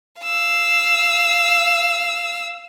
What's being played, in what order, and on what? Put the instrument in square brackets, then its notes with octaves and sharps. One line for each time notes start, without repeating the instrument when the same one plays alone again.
[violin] F5 E6